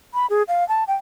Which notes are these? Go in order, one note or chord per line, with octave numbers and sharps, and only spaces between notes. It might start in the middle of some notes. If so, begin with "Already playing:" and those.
B5
G#4
F5
A5
G5